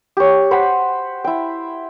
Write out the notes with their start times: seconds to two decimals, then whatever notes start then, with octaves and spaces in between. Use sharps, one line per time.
0.17 G4 C#5
0.51 C5 F#5 G5 B5
1.24 E4 G5